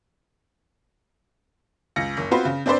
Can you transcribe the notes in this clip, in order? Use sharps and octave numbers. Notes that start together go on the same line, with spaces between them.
C#2 A#6 C#7
F#1
B3 C4 F4 F#4 B4 C5
C#3
C4 D4 B4 C5 D5